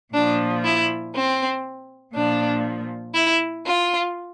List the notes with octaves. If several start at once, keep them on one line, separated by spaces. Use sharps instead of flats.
A#2 F3 D4
E4
C4
A#2 F3 D4
E4
F4